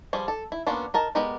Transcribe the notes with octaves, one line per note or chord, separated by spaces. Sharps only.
F3 G3 G#4
A4
E4
A#3 B3 C#4 D4 F4
D#4 A#4 A5
G#3 B3 G4 A#4 D5